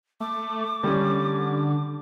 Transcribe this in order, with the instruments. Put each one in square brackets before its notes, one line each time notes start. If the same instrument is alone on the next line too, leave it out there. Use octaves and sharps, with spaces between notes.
[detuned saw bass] A3 [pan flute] D6
[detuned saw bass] D3 [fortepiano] G3 C#4